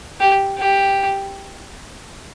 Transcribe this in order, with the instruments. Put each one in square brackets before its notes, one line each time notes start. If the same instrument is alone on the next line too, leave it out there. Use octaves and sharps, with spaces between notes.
[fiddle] G4
G4